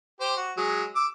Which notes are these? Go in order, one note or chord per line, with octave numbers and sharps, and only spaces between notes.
G4 C5
F#4
F#3 G#3
D6 E6